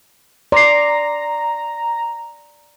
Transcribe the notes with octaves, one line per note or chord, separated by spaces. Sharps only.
D5 A#5 C6 C7